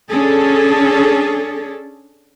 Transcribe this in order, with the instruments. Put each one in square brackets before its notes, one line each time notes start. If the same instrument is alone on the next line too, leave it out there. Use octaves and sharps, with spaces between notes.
[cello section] C#4 D4 G#4 A4